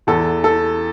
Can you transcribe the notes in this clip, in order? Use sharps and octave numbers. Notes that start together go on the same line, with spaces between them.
E2 E3 A4
A4